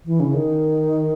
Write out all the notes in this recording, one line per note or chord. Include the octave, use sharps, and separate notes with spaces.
E3
C#3
D#3